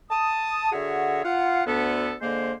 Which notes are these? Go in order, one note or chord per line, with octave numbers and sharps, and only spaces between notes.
A5 D#6
D3 F#4 G#4 C#5 E5 F#5
F4 F5 F#5
D2 B3 A4
D3 G#3 A#3 C5